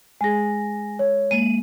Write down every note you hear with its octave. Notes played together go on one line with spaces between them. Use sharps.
G#3 G#4 G#5 A#6
C#5
G#3 A#3 D#7